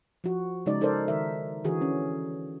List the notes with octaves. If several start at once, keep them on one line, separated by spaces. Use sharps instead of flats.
F3 F#4
C#3 G#3 D#4 D5
D#4 A4 A#4 C5 D5
D#3 A#4 E5
D3 E3 F#4 G#4
C#4